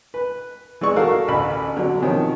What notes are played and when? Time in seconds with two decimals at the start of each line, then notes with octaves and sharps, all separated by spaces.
0.14 B4
0.81 E3 G#3 D5 C#6
0.96 F#4 A4 A#4 F5
1.28 A1 D2 B5
1.76 D3 F#3
2.02 C3 D#3 F3 C#4